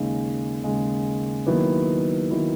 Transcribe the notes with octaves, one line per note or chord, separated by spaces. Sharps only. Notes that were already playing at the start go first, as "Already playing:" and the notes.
Already playing: D#2 C#3 G#3
D#2 C#3 G#3
D#2 D#3 F#3 B3 E4
D#3 F#3 B3 E4